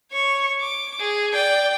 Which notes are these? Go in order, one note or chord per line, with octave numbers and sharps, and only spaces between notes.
C#5 C#6
D6
G#4
D5 G5